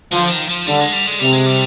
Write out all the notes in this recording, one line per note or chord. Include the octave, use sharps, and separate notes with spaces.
D3 F3
D#3
F3
D3 G3
G#3
G3
G#3
C3 G3
G#3
G3